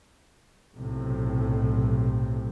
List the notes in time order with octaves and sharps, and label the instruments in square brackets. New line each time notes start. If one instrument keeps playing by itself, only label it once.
[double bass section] B1 A2 C3